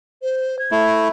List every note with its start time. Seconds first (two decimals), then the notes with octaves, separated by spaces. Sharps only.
0.22 C5
0.59 G#6
0.71 A3 E4